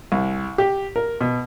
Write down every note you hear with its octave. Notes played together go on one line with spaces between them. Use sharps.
C2
G4
A#4
B2